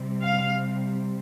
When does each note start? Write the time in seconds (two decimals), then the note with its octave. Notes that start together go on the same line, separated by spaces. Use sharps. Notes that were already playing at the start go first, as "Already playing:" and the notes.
Already playing: C3 G3 C4
0.23 F5